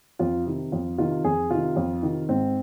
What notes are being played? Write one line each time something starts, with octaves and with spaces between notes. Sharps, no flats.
F2 F4
C3 D#3
F2 F4
C3 D#3 F4
F2 G#4
C3 D#3 F4
F2
C3 D#3
G#2 C4